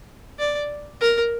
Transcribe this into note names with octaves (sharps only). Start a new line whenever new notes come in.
D5
A#4